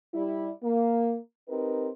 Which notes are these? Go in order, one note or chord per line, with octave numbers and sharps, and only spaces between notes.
G3 E4
A#3
C4 D#4 G4 A#4 B4